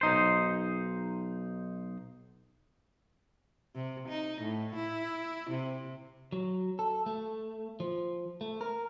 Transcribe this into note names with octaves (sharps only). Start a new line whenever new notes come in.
B1 D#4 C5
C3
D#4
A2
E4
C3
F#3
A4
A3
F3
A3
A#4